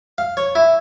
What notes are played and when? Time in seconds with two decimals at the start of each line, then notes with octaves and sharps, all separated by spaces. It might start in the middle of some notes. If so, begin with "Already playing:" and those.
0.18 F5
0.37 C#5
0.55 E4